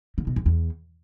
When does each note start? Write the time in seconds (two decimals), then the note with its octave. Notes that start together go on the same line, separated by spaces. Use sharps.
0.18 D3
0.27 B2
0.36 F2
0.46 E2